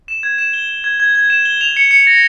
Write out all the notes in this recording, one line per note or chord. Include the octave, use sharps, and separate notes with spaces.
E7
G#6
E7
G7
G7
G#6
G#6
G#6
E7
G7
F7
C#7
C#7
A#6